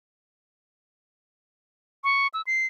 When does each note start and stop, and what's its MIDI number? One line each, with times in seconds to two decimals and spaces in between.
2.04 2.27 85
2.34 2.42 88
2.47 2.67 96